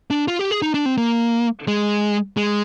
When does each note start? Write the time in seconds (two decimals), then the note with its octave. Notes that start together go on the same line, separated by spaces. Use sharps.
0.11 D4
0.28 F4
0.39 G4
0.51 G#4
0.62 D#4
0.74 D4
0.86 C4
0.98 A#3
1.67 G#3
2.37 G#3